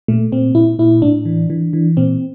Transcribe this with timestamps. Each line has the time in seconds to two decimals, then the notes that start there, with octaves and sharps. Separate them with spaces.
0.08 A#2 A3
0.32 A#2 C4
0.55 A#2 E4
0.79 A#2 E4
1.02 A2 D4
1.25 E3
1.50 E3
1.73 E3
1.97 A#2 C4